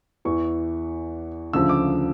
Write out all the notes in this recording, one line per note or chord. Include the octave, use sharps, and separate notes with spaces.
E2 E3 C#6
D2 C#3 F3 E6
D6